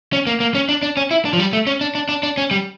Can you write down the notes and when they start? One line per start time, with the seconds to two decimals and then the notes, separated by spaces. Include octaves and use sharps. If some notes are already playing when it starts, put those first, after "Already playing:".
0.13 C#4
0.27 A#3
0.40 A#3
0.55 C#4
0.69 D4
0.83 D4
0.97 C#4
1.11 E4
1.25 D4
1.33 F3
1.39 G3
1.53 A3
1.67 C#4
1.81 D4
1.95 D4
2.09 D4
2.23 D4
2.38 C#4
2.51 G3